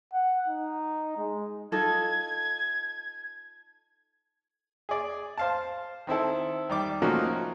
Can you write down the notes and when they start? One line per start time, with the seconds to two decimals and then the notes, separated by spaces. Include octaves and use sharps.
0.13 F#5
0.48 D#4
1.17 G#3
1.72 D#4 F4 A4 G#6
4.89 G#4 D5
5.37 C5 F5 A5
6.07 D#3 C4 E4 A4
6.70 D#3 G3 D6
7.02 F3 A3 A#3 C#4 D#4 F#4